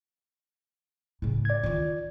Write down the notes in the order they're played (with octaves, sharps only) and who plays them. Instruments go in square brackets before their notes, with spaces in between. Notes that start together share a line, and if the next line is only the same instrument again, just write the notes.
[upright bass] A2 C#3
[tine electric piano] D5 G#6
[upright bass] D#3 F4